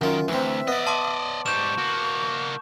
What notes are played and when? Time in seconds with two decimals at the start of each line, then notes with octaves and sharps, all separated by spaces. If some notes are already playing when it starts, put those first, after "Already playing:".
0.01 F#2 D#3 F4
0.28 D2 E3 C4 E5
0.68 B3 D5 D#5
0.87 A5 C6 D6
1.46 G#2 G3 C#6 G6 E7
1.78 A#3 F#4